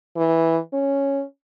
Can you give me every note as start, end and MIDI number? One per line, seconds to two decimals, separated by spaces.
0.16 0.58 52
0.73 1.23 61